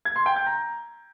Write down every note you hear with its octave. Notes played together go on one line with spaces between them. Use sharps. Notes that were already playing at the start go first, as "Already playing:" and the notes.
G#6
C6
G5
G6
A#5